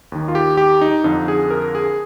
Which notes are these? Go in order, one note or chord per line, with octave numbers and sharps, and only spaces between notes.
D#2 D#3
F4
G4
G4
D#4
F2 D3 F3 D#4
G#4
A#4
G#4